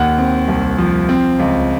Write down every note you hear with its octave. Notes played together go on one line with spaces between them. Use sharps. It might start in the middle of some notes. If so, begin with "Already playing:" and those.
Already playing: D#2 F#5
C4
C2
F3
C4
C#2